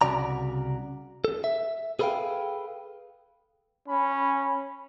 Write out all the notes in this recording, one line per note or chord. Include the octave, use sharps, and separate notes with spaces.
C2 F#2 C#3 F#4 D5 A#5
A4
E5
G#4 A4 B4 C#5 F5 G5
C#4 B5